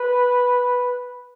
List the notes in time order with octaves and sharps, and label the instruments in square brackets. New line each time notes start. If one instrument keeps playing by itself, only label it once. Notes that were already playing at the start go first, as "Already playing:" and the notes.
Already playing: [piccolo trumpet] B4